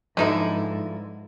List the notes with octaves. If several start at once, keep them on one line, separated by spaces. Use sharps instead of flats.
G#2 D3 F3 D#4 E4 A4 B4